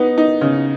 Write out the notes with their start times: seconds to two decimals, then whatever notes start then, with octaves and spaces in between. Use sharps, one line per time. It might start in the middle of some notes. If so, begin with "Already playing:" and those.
Already playing: B3 D#4
0.18 D#4
0.41 C#3